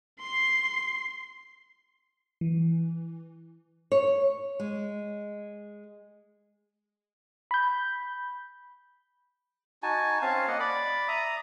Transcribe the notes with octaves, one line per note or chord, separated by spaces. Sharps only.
C6 C7
E3
C#5
G#3
B5 G6
D#4 F#4 G#5 A5
C4 C#4 F5 A5
A#3 D#5 F#5
D5 B5 D6
E5 A#5 D#6